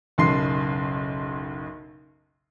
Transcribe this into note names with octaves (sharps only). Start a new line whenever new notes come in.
F#1 B1 C#3 C6 C7